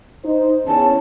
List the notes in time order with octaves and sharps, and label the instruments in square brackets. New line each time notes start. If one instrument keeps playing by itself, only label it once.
[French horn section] D#4 C5
[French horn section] E2 C#4 [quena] A5